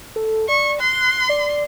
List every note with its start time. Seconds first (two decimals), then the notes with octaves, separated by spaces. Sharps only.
0.16 A4
0.49 D5 C#6
0.80 C6 F#6
1.29 D5